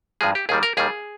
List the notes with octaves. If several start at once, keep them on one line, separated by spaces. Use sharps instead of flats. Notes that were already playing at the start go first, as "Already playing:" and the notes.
G2 F3 G#3 G#4
G4
D#2 D#3 G3 G#4
A#4
D#2 D#3 G3 G#4